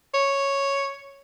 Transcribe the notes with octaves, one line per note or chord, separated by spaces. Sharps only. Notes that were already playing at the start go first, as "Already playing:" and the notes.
C#5